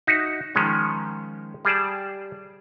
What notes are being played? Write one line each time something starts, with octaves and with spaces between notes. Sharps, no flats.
D#4 F#4 E5
D#3 F3 G#3 C#4
G3 G#4 D5 A5